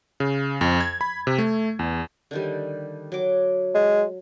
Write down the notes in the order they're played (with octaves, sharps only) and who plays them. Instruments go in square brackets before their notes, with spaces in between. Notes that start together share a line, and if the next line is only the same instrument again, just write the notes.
[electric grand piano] C#3
F2
G#6
B5
C3
A3
E2
[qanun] D3 D#3 G3
F#3 D6
[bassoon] G#3